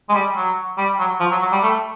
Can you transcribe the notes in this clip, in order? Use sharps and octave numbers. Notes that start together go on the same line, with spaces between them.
G#3
G3
F#3
G3
F#3
F3
F#3
F#3
G3
A3